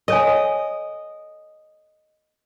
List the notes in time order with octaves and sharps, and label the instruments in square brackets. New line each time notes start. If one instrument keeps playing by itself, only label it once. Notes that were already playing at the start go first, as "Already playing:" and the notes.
[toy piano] A4 C#5 G#5 [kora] D#5